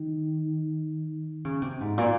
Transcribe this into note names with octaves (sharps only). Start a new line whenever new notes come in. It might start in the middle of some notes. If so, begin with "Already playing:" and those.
Already playing: D#3
C#3
C3
G#2
A#2